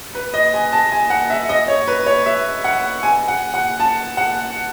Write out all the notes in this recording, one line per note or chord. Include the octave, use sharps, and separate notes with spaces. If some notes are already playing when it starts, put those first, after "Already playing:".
B4
D#5
G#5
A5
G#5
F#5
E5
D#5
C#5
B4
C#5
E5
F#5
G#5
F#5
F#5
A5
F#5